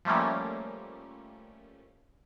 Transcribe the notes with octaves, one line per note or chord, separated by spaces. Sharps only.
F3 G3 A3 A#3 C#4